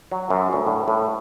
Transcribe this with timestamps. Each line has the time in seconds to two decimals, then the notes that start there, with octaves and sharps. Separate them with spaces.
0.12 F#3
0.30 F#2
0.53 D2
0.67 A2
0.88 A2